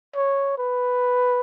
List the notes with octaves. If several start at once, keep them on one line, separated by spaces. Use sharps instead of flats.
C#5
B4